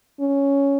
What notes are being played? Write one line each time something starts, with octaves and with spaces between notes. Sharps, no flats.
C#4